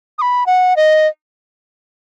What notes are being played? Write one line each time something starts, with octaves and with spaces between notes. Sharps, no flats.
D#6
B5
F#5
D#5